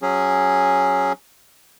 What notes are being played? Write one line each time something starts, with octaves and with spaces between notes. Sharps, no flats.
F#3 C#4 G#4